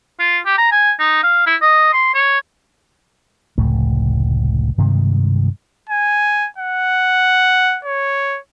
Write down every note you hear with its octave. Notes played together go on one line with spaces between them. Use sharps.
F4
G4
A#5
G#5
D#4
F5
E4
D#5
C6
C#5
F1 C#2 A2 A3
G2 C3 D#3 G#3
G#5
F#5
C#5